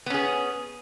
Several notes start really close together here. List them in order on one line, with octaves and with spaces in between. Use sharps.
B3 C#4 G#4